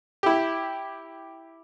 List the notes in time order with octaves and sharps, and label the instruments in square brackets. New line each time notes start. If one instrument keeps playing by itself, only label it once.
[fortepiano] E4 G4